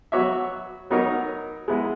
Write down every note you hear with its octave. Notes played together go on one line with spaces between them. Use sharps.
F#3 B3 F#4 C#5 E5
F#3 B3 D#4 A#4 C#5
G#3 B3 E4